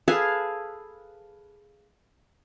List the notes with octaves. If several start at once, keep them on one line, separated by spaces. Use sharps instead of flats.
G#4 A4 B4 F5